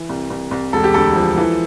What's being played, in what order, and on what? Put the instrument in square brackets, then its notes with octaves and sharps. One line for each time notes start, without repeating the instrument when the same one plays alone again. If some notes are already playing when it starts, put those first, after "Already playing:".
Already playing: [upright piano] E3
C2
C2
C2
E1 A4
G4
D2 A4
F3
E3